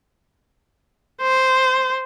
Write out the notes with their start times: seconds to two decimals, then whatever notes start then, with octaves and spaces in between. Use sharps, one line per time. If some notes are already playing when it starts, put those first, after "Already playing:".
1.21 C5